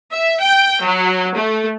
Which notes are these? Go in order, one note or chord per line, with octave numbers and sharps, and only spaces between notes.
E5
G5
F#3
A3